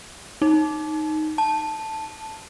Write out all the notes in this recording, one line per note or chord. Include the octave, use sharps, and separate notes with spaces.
D#4
A5